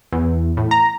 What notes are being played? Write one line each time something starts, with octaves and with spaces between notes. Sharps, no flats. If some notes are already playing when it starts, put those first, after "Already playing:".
E2
A2
A#5